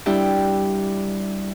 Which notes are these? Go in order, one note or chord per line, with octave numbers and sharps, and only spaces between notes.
G3 D4 E4 G4